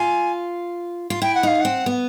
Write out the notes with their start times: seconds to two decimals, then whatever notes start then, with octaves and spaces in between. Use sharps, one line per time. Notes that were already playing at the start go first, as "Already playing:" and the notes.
Already playing: F4 G#5
1.10 F4
1.21 E4 G5
1.34 F#5
1.43 D#4 F5
1.60 F#5
1.65 C4
1.86 B3